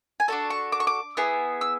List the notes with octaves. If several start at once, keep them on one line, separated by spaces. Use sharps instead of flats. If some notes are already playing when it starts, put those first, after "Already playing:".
G#5
D4 F#4 A4 A5
C#6
D6
C#6
D6
B3 E4 G#4
E6